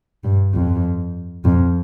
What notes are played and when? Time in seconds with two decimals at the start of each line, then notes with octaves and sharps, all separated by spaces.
0.24 G2
0.54 F2
1.45 F2